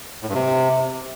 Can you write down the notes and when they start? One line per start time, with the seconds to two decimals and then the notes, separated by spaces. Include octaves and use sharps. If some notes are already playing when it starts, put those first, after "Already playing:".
0.23 A2
0.29 G2
0.35 C3